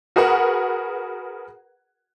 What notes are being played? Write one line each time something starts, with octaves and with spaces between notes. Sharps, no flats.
F#4 G#4 A#4 B4 F#5